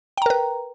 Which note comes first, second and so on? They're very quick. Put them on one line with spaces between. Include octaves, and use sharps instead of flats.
G5 A#5 A#4 B4